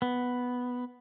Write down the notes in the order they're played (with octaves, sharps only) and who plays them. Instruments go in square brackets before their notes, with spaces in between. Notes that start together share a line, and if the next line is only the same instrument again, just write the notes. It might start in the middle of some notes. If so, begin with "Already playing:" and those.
[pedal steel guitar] B3